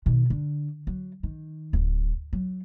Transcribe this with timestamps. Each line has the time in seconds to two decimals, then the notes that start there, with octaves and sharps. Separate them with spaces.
0.06 B2 D#3
0.30 D3
0.87 F#3
1.23 D#3
1.73 D1
2.33 F#3